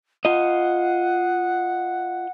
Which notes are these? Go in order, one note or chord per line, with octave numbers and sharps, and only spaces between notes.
F4 D#5 F#5